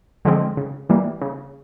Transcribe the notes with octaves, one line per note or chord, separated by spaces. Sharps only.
D3 F3 G#3 C4
C#3
E3 G3 A#3
C#3